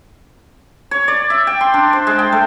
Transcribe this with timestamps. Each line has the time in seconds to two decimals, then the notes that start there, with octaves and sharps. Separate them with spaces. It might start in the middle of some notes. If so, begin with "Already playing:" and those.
0.91 C#5
1.08 D5
1.30 E5
1.47 G5
1.61 C6
1.74 D4
1.93 C5
2.07 G#3
2.19 G5
2.32 A3